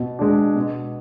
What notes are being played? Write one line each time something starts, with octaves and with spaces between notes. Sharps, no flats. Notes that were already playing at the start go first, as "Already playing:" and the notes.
Already playing: B2
G#3 D4
B2